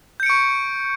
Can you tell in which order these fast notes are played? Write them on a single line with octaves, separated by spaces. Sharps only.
G6 C#7 D7 C#6